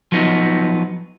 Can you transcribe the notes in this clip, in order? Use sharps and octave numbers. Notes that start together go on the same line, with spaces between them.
F3 F#3 B3 D#4